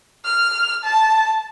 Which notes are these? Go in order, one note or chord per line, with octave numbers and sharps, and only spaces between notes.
F6
A5